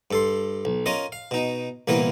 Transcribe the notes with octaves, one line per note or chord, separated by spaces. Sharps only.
G2 A4 C6
B1
C#4 F4 A#4 D#5
F5
B2 D#4
C2 A#2 E3 B3 A#4